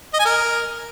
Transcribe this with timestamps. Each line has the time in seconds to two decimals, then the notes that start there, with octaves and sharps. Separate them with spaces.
0.14 D#5
0.19 G#5
0.25 A#4